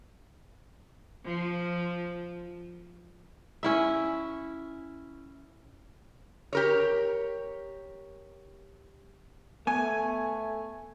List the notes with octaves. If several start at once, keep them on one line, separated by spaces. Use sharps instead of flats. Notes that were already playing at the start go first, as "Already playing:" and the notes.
F3
C#4 E4 E5
G4 A#4 C#5
A3 B3 G#5